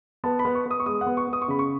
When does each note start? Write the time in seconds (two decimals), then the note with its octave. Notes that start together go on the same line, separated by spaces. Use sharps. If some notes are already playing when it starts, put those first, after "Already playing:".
0.24 B3 A5
0.39 B5
0.45 B3
0.55 C#6
0.66 B3
0.71 D#6
0.80 C#6
0.86 G#3 D#6
1.01 F#5
1.07 B3
1.17 C#6
1.28 B3
1.33 D#6
1.42 C#6
1.48 C#3 B5
1.59 C#6